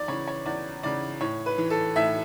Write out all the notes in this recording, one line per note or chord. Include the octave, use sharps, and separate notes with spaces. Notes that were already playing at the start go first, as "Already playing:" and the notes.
Already playing: E2 D5
C#3 E3 C#5
C#5
E2 D5
C#3 E3 D5
A2 C#5
B4
E3
A4
A2 E5